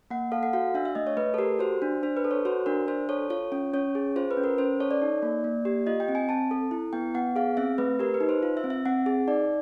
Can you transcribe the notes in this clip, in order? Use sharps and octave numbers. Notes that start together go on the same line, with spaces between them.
A#3 F#5
A4 F5
F#5
F#4 F5
D4 E5
E5
A3 D#5
C#5
A3 B4
A4
G4 A#4
F#4 C5
D4
D4 C5
B4
A4
C#5
F#4 C5
D4 A#4
D4 C5
A4 C#5
F4 C#5
C#4
C#4 C#5
G#4
F4 C5
B4
C#4
A#4
C#4 C5
A4 C#5
D5
D#4
A#3
A#3
G4
F4 D#5
G5
C4
G#5
C4 A5
A4
E4
B3 G5
B3 F#5
G#4 F5
C4 E5
A3 B4
G4 A#4
B4
D#4
C5
F4
E5
C4
E5
C4 F#5
G#4
D#4 D5